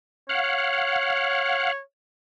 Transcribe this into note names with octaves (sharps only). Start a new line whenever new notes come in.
C#5 F5 F#5